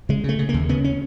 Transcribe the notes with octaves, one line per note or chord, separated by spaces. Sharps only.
C#3 G#3
C#3 A3
C#3
A#3
D#2
C#3 B3
C#4